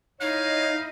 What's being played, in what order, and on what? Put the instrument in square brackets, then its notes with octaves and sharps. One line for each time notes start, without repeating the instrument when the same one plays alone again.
[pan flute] D#4 [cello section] E4 D#5 [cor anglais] C#5 [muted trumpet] F5